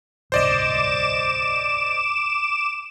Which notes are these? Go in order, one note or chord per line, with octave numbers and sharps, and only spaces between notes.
D1 C2 G2 C5 D5 D#5 D6 E7